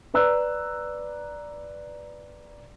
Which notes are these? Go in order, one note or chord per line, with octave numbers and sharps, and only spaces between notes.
B4 D5 A#5 E6 F#6